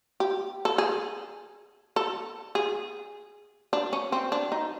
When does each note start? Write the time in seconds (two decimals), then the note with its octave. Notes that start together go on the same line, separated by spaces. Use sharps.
0.20 G4
0.65 A4
0.78 G#4
1.96 A4
2.55 G#4
3.73 D4
3.93 C#4
4.12 C4
4.32 D4
4.52 D#4